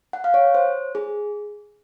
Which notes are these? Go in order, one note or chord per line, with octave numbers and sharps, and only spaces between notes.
F#5
F5
C#5
C5
G#4